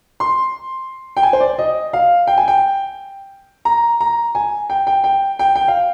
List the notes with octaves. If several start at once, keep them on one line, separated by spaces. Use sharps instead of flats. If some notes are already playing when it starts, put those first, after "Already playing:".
C6
G5
G#5
C5
D5
D#5
F5
G5
G#5
G5
A#5
A#5
G#5
G5
G5
G5
G5
G5
F5